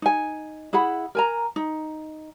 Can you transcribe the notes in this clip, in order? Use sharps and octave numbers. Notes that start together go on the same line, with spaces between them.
D#4 G#5
E4 G#4 F#5 B5
A#4 G#5 A#5
D#4